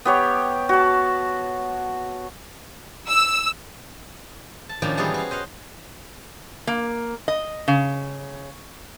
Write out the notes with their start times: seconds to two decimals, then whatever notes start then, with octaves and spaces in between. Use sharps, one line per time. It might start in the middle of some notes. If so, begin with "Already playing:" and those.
0.05 B3 G4 C#5
0.69 F#4 A5
3.09 E6
4.69 A5
4.82 A2 D#3 F3 A#3 C#4 D4
4.97 E3 G3 B3 F4 G#4 C#5
5.14 F#4 F5
5.31 C5 D#5 F5 F#5
6.67 A#3
7.28 D#5
7.68 C#3